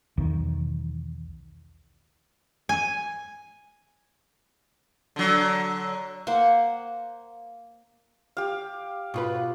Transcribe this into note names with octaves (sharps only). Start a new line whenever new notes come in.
B1 E2 D#3
G#5
D3 F#3
A#3 C5 F#5
G4 F5
B2 F4 B4